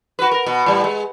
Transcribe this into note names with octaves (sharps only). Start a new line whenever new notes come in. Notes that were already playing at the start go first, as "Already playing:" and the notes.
F#4 B4
A#4
B2
A2 G3
G#3